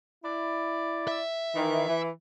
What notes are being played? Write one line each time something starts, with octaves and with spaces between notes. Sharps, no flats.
E4 D5
E5
D#3 E3
E3